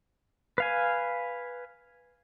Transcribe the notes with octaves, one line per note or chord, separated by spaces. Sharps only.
B4 F5 G#5